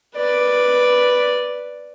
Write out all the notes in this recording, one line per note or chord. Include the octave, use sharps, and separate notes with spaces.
B4 D5